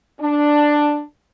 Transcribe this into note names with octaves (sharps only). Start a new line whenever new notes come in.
D4